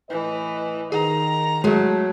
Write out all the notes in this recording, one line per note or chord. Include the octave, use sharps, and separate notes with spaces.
A2 E3 B4 D#5
D#3 G#4 A#5
F#3 G#3 A3 G#4